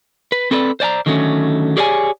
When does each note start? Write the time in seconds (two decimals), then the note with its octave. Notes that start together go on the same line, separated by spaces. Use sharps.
0.32 B4
0.51 C4 A4 B4 C#5 D5
0.80 C5 D5 G#5 A#5
1.06 D3 D#3 F#3 G#3 A3 C#4
1.77 G4 G#4 C#5 D5 E5 G#5